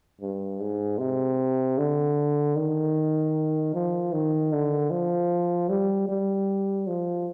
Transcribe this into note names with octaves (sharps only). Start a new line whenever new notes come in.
G2
G#2
C3
D3
D#3
F3
D#3
D3
F3
G3
G3
F3